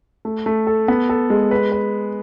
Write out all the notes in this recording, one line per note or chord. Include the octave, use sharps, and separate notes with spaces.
A3
A3
A4
B3
A4
G#3
B4
B4